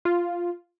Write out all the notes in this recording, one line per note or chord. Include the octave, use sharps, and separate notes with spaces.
F4